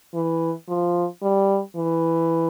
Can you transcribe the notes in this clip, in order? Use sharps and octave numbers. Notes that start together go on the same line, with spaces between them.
E3
F3
G3
E3